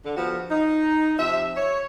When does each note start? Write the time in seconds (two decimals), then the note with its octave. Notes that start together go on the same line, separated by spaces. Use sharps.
0.05 D3
0.16 F3 B3 F#4 G4
0.51 D#4
1.19 C3 F3 E5
1.57 C#5